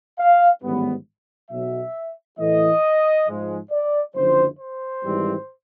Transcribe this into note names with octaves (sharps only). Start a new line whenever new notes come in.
F5
A1 G#2 D#3 G3 B3
B1 B2 F#3 E5
A2 E3 A3 D#5
G#2 F3 G#3
D5
F#1 F#2 D3 F3 C5
C5
G#1 G#2 E3 G3 C4